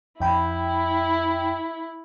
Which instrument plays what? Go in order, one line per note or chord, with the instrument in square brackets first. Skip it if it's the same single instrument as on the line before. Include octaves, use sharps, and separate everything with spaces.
[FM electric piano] F2 G5 B5 [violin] E4